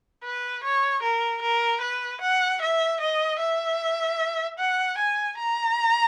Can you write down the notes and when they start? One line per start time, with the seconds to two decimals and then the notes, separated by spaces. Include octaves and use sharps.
0.24 B4
0.64 C#5
1.03 A#4
1.42 A#4
1.82 B4
2.21 F#5
2.62 E5
3.01 D#5
3.40 E5
4.58 F#5
4.98 G#5
5.38 A#5